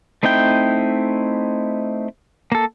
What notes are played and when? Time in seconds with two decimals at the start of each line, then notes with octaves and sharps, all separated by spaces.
0.23 A3 C4 D#4 E4 G5
2.52 A#3 A4